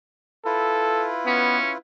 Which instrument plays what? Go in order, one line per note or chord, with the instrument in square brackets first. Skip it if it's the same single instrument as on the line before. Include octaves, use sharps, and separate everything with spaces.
[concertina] E4 F4 B4 [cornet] A4
[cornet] B3 [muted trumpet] C#4